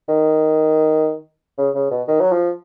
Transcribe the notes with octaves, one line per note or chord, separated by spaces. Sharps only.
D#3
C#3
C#3
B2
D#3
F#3
F3